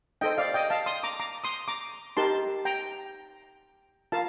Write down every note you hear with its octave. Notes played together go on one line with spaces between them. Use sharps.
D#4 A4 C5 D#5 G5
D5 F5
D#5 G5
F5 A5
C6 D#6
A#5 D6
A#5 D6
C6 D#6
A#5 D6
D#4 G4 A#4 A5 C6
G5 A#5
F4 A#4 F5 A5